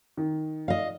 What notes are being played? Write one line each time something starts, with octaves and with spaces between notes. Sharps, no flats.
D#3
D#5 F5